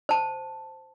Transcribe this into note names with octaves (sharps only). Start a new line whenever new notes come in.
C5 A5